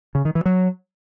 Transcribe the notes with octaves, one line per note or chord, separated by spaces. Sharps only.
C#3
D#3
E3
F#3